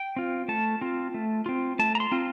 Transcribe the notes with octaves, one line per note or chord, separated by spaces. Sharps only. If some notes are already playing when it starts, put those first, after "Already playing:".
Already playing: G5
C4 F4
A3 A5
C4 F4
A3
C4 F4
A3 A5
A#5
C6
C4 F4